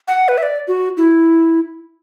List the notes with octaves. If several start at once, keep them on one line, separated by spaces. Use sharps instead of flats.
F#5
B4
E5
D5
F#4
E4